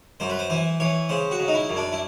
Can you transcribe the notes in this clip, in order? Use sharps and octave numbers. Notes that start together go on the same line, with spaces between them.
F#2 C5
B4
C5
E3 C5
E3 C#5
C#3 C5
F#4
C#3
D#4
E4
F#2
D4
E4